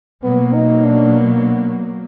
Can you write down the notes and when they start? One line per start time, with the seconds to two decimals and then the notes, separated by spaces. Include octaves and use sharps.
0.23 B2 F#3 A#3 B3
0.54 D#4
0.85 D4